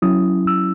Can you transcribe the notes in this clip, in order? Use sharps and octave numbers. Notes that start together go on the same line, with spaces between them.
F#3 C#4 E4 D#6
E6